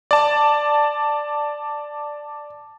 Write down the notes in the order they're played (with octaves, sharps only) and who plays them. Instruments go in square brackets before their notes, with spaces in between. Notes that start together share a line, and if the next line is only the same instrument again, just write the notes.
[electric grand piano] D5 A5